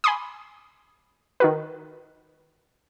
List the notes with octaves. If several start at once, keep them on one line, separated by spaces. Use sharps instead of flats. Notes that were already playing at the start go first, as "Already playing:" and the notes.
G#5 B5 C6 D6 D#6
D#3 F#4 B4